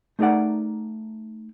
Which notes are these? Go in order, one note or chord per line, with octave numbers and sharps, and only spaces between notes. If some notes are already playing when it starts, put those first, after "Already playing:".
A3 D#4 G#4 A#4 D5 F#5